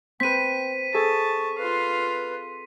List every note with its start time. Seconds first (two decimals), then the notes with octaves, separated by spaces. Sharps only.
0.20 C4 B4 G5 B6 D#7
0.94 G#4 A4 D#5 A5 C#6
1.58 F4 B4 F5